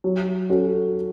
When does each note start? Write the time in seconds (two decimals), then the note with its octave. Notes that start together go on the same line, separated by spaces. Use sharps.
0.04 F#3
0.50 C#4 F#4 A4